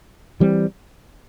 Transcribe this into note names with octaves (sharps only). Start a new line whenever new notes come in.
E3 G3 C4